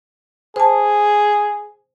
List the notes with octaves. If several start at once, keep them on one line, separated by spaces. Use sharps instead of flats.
G#4 C5 A5